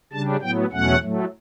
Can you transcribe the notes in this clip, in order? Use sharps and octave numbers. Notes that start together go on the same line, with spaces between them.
C#3 G3 D4 A5
A2 F#3 B3 G5
E2 B2 F#3 A3 C#4 F#5
A2 F#3 A3